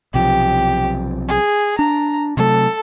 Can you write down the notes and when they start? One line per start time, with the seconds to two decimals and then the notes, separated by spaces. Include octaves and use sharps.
0.14 B1 C3 F3 G4
1.28 G#4
1.79 D4 A#5
2.37 C3 F#3 A3 A4